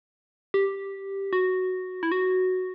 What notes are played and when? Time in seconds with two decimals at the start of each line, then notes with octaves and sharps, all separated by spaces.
0.54 G4
1.33 F#4
2.03 E4
2.12 F#4